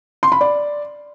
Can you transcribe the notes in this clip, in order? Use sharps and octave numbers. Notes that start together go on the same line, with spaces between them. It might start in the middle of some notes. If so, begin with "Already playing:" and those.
C6
B5
D5